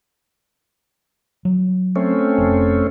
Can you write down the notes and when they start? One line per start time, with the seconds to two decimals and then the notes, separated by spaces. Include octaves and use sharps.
1.45 F#3
1.96 A3 C4 C#4
2.38 F1